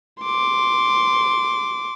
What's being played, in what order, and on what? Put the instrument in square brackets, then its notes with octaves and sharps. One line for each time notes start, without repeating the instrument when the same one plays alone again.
[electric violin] C6 D6